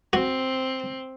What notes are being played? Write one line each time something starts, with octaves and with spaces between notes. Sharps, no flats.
C4 F#4